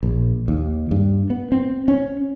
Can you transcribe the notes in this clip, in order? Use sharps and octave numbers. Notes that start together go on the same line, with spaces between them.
A#1
D#2
G2
B3
C4
C#4